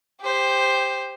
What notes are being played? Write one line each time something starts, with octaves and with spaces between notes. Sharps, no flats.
G4 C5